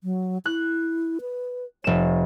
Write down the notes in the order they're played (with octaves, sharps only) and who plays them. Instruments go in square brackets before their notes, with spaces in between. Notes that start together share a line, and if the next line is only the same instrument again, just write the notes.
[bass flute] F#3
[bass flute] E4 [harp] F#6
[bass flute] B4
[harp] F1 E7 [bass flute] C#5